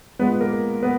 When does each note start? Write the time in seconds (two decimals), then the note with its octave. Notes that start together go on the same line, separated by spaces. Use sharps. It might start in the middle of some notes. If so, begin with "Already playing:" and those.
0.19 G#3 B3 B4
0.23 A#2
0.40 A#3 A#4
0.83 B3 B4